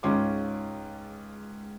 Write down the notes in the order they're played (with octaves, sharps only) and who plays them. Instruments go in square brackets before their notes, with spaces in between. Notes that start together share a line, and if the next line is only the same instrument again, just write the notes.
[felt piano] C#2 G#2 C#4 F4 C6 D6